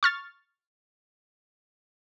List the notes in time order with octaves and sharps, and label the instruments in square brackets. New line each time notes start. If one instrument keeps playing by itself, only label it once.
[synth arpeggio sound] C#6 F6 A6